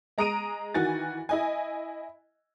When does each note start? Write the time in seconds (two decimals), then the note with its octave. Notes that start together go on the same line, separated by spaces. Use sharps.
0.18 G#3 A#5 D#6 D7 D#7
0.74 D#3 E3 F#4 G#5 A6
1.29 E4 D#5 G#5